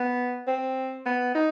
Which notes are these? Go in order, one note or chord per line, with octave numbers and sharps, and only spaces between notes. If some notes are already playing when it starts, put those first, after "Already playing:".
Already playing: B3
C4
B3
D#4